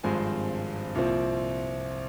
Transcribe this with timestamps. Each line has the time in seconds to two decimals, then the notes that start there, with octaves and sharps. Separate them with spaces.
0.04 G#1 G2 F3 G#3 C4 G#5
0.95 C2 A#2 F3 C4